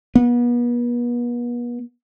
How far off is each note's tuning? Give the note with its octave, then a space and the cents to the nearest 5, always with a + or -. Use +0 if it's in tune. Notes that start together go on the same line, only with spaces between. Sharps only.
B3 -40